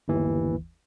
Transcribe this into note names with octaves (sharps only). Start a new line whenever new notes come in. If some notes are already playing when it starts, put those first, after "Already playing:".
G1 D#2 E3